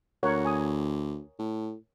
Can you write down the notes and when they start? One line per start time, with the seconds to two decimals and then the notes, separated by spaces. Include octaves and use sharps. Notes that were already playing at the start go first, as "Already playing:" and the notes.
0.23 D2 A#4 C#5 F#5
0.45 G#5 D#6
1.39 A2